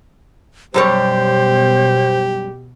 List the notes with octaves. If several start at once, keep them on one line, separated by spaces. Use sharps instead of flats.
F#2 B2 G3 G4 C5 C#5